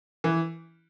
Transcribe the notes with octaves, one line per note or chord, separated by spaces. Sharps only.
E3